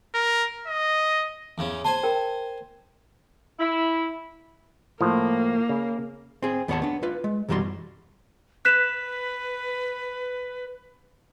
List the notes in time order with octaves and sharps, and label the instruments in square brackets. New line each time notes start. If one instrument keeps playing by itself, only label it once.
[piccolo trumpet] A#4
D#5
[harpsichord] E2 C#3 C#4
[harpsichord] C5 G#5 C6 [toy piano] A5
[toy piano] A#4 G5
[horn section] E4
[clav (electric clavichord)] A2 F3 [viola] A#3
[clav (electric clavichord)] C#3
[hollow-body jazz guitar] C4 G#4
D#2 B3 G#4 C#5 F#5 A5
B3 D4
F4 B4
G#3
B1 F#2 E3 G3 F#4 C6
[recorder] B4 [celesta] F#6 B6 E7